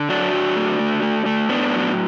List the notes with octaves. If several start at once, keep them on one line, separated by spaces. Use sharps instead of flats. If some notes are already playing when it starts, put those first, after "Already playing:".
Already playing: D3
F#3 D4 F#4
F#3
A3
A3
A3
A3
A2 B3 D4
F#3